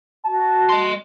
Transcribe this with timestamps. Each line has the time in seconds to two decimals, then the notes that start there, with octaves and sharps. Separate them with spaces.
0.25 F#4 A5
0.69 D#5 C6